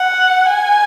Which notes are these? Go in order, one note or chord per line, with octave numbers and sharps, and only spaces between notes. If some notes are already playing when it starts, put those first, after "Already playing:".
Already playing: F#5
G#5